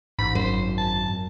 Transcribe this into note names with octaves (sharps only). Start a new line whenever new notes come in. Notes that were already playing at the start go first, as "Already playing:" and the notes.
A1 G#2 B5
G#1 F#2 C5
A5